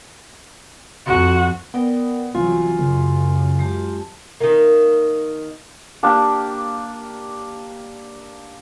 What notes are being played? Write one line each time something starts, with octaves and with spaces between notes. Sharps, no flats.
F2 F#4
B3 A#4 D5 G5
C2 E3 F#3 F4 G#5
F#2 C#3
G#3 G4 A5
D#3 A#3
A#3 D4 G4